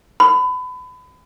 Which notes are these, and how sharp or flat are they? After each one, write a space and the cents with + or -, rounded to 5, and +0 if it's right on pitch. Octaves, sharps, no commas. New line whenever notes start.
B5 +30